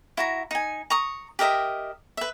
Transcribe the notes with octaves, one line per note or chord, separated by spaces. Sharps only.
E4 F#4 A#5
D#4 G#5
A#5 C#6 D#6
G4 A#4 D#5 E5
B4 E5